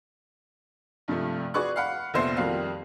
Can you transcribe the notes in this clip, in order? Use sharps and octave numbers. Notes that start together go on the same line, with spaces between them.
G2 C3 F3 A3
F#4 G#4 B4 D5 C#6 F#6
F5 F#5 B5
F1 A#1 B3 C5 E5 C7
F2 D#3 G3 F#4 F5